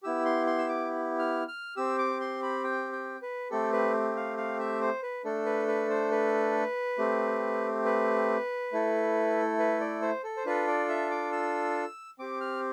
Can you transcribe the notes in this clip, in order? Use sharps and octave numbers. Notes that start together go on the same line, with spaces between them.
B3 E4 G4 E6
C6
C6
E6
D6
F6
F6
C4 G4 E6
D6
C6
B5
G5
G5
B4
A3 C4 G4 A4
B4
F5
F5
E5
C5
B4
A3 D4 A4
B4
B4
C5
B4
A3 C4 G4
B4
A3 E4 A4
B4
D5
C5
A4
C5
D4 F4 A4 B4
D5
E5
D6
E6
C4 G4 D6
F6